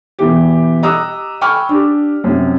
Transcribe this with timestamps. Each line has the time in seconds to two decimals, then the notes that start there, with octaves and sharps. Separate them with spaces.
0.19 B2 E3 G4
0.82 G4 D#5 A#5 D#6 E6 F#6
1.41 G5 G#5 B5 C#6 F6
1.69 D4 G4
2.24 F#2 C3